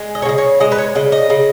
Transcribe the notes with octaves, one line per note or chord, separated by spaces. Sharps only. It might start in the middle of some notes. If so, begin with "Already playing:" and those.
Already playing: G#3
D#5
C#5
C#3 D#5
C#5
G#3 D#5
B4
C#5
C#3 D#5
D#5
C#3